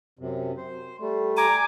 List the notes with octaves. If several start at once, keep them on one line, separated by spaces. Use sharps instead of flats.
F#2 C3
C5
G3 A3
G#5 A#5 D6